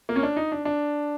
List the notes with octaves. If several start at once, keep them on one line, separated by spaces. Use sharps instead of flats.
A#3
C#4
D4
D#4
D4
D4